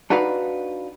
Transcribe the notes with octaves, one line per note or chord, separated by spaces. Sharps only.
D4 D#4 F#4 B4 D5 F5